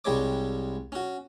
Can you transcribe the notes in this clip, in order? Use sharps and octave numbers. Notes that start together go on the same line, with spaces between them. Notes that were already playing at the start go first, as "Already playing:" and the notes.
C2 G3 G#3 C#5 D6
C#4 F#4